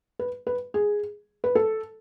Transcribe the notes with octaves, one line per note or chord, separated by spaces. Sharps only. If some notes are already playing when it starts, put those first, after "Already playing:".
B4
B4
G#4
B4
A4